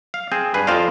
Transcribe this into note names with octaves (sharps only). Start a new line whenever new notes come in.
F5
C4 G#4 C5
G2 G#4 B4
F2 F4 C5 D5 D#5 F5